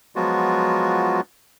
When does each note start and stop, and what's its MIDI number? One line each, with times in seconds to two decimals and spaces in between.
0.16 1.21 53
0.16 1.21 54
0.16 1.21 56
0.16 1.21 59
0.16 1.21 65
0.16 1.21 66